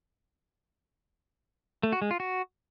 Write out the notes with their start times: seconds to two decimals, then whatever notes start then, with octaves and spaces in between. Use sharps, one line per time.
1.83 A3
1.92 F#4
2.02 G#3
2.11 F4
2.20 F#4